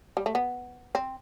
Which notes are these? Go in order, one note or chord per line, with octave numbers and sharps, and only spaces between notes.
G3
A3
B3
C4